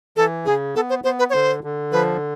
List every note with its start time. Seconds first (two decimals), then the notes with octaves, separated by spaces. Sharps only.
0.16 E3 A4
0.46 C#3 G#4
0.75 B3 A4
0.90 C5
1.04 B3 C5
1.19 B4
1.30 C#5
1.33 D3 C5
1.64 D3
1.92 F3 B4